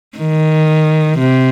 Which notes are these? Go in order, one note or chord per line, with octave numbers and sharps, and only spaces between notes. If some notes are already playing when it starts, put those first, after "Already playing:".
D#3
C3